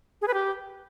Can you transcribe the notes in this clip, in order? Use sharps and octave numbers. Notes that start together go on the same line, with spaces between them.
G#4
B4
G4